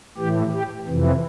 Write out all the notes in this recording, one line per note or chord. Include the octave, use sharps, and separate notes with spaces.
A2 E3 G4
G4
F2 C3 E3